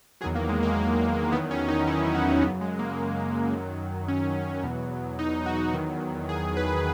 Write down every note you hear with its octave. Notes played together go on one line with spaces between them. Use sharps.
E2 D#3 F#3 G#4
A#3
G#3
A#3
E2 D#3 F#3 B3
C#4
D#4
E4
F#4
F#2 C#3 F#3 B3
G#3
A#3
F#2 D#3 F#3
C#4
E2 B2 F#3
D#4
F#4
E2 D#3 F#3
G#4
B4